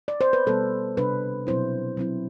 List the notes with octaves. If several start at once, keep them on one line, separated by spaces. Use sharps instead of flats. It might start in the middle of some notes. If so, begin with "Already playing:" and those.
D5
C5
B4
B2 G3 B3 A4
C3 G3 D4 B4
B2 F#3 C4 E4 C5
F#3 C4 E4